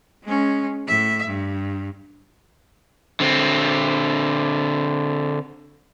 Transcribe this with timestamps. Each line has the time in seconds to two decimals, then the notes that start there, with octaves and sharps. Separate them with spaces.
0.24 G#3 C#4
0.86 A2 E5
1.27 G2
3.20 D3 C4